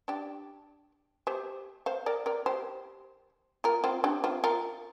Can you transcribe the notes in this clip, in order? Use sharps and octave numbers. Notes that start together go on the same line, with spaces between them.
D4 G4
G4 C5
C5 F5
A#4 D5
A#4 D5
G4 C5
F4 A#4
C4 F4
D4 G4
C4 F4
F4 A#4